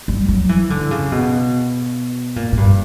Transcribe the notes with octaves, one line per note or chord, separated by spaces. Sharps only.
G3
F#3
E3
D3
C#3
B2
A#2
A#2
G2